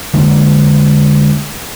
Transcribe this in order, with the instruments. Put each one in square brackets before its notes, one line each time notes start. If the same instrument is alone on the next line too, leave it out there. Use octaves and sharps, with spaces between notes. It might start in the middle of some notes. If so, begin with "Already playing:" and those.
[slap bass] D3 G#3 A#3